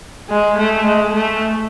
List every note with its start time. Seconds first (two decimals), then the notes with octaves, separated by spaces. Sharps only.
0.29 G#3
0.58 A3
0.86 G#3
1.14 A3